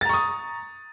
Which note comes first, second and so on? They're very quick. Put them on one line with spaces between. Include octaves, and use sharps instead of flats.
A6 A#5 C#6 D#6